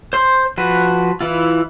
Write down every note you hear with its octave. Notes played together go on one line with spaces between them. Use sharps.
C5 C6
F3 F#4 B4
E3 E4 F4